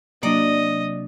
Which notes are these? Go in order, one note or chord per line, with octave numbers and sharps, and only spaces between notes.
C3 F#3 A#3 D4 D5 D#5